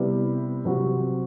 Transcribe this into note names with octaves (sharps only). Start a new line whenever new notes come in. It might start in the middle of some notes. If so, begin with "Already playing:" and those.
Already playing: C3 G3 B3 E4
C3 F#3 C4 F#4